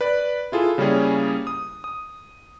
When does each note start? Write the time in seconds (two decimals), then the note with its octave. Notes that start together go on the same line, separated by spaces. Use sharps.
0.01 B4 D5 F#6
0.52 E4 F4 G#4 A4
0.78 C#3 G3 A#3 C#4 E4 G#4
1.47 D#6
1.84 D#6